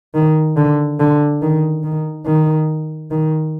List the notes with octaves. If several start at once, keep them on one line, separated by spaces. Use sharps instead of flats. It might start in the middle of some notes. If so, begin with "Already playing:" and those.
D#3
D3
D3
D#3
D#3
D#3
D#3